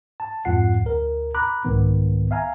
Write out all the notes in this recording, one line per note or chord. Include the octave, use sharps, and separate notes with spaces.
A5
F2 G#2 F4 F#5 C7
D2 A#4
A#5 B5 D6 F#6
C2 G#2 D#3 B3
E5 F5 G#5 A#5